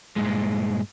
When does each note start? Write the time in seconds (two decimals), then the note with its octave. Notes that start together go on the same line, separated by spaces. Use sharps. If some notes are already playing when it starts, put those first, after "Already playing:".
0.16 G2 A#2 G#3